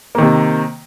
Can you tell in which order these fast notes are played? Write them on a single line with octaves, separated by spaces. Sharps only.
A#3 D#3 C3